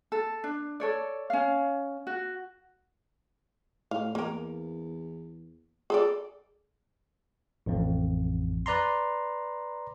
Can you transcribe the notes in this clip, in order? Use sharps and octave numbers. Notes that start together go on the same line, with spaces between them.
A4
D4
A4 C#5 D5
C#4 F5
F#4
A2 F5
E2 A#3 A#4
G#4 A4 D5
A1 F2
B4 D5 A#5 C6